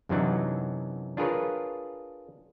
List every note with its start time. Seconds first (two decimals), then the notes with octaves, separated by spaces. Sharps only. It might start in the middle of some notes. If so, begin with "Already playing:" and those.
0.09 F#2 C3 E3 F#3 D4 D#4
1.17 D4 F4 G#4 A#4 B4 C#5